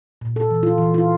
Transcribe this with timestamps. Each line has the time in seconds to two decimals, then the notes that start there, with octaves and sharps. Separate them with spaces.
0.21 A#2
0.36 A4
0.51 E3
0.63 F4
0.78 E3
0.94 F4